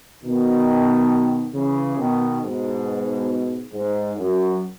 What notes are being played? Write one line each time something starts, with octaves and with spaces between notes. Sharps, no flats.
B2 D#3
C#3 E3
B2 D#3
G#2 B2
G#2
F#2